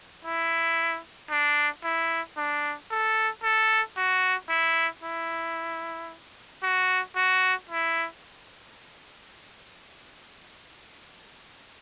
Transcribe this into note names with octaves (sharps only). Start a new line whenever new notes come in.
E4
D4
E4
D4
A4
A4
F#4
E4
E4
F#4
F#4
E4